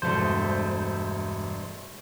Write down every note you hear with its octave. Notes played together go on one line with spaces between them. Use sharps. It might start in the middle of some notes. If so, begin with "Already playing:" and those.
E1 G2 A3 C5